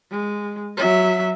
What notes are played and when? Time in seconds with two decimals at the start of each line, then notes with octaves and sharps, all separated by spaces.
0.11 G#3
0.76 F#3 E5